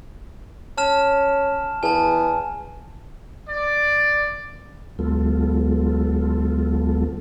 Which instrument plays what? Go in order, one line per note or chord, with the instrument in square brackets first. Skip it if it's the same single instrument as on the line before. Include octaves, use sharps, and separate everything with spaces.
[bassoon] C#4 [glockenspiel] A5 F6 E7
[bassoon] E2 [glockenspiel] G#5 A5
[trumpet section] D5
[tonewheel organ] D2 F#3 G#3 B3 F4 A4